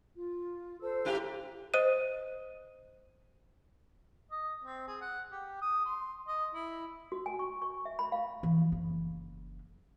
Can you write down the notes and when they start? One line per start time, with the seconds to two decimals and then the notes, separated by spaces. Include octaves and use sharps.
0.14 F4
0.81 A4 C5 E6
1.05 G#2 E4 G4
1.74 C5 D#5 D#6 F#6 D#7
4.31 D#5
4.64 C4
4.87 G#4
5.01 F#5
5.32 G4
5.61 D#6
5.85 C6
6.28 D#5
6.54 E4
7.12 F#4
7.26 G#5
7.39 C#6
7.62 C#6
7.85 E5
7.99 B5
8.12 F5
8.43 E3 F3
8.72 F#1